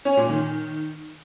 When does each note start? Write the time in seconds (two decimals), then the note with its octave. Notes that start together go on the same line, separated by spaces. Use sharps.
0.05 C#4
0.17 A#2
0.29 D#3